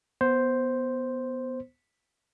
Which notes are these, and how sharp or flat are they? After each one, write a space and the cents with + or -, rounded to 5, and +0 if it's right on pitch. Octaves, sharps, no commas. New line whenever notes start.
B3 +0 C5 +0